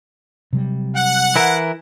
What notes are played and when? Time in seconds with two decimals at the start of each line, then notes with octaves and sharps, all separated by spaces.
0.53 C3 F#3 G3
0.96 F#5
1.36 E3 E4 A#4